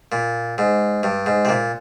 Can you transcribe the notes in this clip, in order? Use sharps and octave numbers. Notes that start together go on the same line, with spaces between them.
A#2
G#2
G2
G#2
C3
A#2